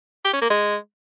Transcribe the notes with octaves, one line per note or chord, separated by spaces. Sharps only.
G4
C#4
A#3
G#3